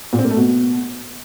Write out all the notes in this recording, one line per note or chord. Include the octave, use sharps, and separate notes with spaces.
A#2
C4
A#3
A3
B2